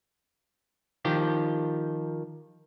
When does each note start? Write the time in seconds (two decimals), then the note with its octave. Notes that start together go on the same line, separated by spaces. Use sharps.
1.05 D#3 F3 G4